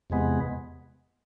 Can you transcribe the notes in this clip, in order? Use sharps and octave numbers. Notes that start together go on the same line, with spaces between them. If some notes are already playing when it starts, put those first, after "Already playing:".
E2 C3 G#3 B3